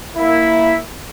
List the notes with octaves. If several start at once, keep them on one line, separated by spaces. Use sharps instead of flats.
A#3 E4